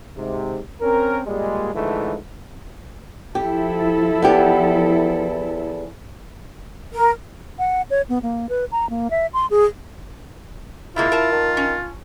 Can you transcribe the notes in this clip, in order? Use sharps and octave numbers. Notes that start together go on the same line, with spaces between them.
G#2 C3
C4 C#4 A#4
A#2 G3 G#3
G#2 D3 E3 F3 A3
F3 E4 G4 A4
E2 B3 G4
A#4
F#5
C#5
B3
A#3
B4
A#5
A#3
E5
C6
G#4
C3 G#3 A#3 E4 F4
A#4 A5
D#3
C#4